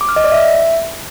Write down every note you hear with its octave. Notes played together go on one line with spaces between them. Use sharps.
D6
F6
D#5
D5
E5